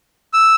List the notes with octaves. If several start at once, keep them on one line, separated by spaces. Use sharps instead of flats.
E6